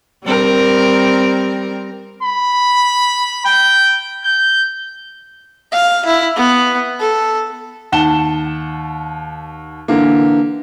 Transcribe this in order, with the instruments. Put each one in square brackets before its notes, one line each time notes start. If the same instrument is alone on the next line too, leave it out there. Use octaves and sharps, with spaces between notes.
[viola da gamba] G3 C4 A#4
[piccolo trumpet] B5
G5
G6
[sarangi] F5
E4
B3
A4
[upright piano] D#2 F#5 A5 E7 G7
D3 E3 A#3